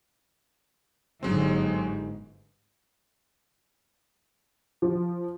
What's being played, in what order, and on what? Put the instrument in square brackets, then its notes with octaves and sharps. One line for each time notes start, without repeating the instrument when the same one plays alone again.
[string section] G1 G#2 [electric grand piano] F#3 G#3 C4
[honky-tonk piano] F3